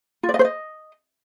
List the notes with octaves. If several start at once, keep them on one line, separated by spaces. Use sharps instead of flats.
F4
D5
D#5
C5
D#5